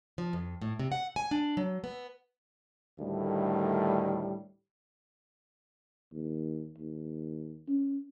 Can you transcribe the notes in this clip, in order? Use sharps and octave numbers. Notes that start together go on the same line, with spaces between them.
F3
F2
A2
C3
F#5
G#5
D4
F#3
B3
D2 A2 D#3 G3
D#2
D#2
C#4